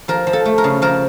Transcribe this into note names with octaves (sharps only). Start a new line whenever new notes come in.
F3 A#4
F3
A4
A3
A#4
C#3
F3 A#4